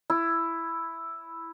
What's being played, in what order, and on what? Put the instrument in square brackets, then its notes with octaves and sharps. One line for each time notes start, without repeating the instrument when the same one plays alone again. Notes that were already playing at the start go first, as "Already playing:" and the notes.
[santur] E4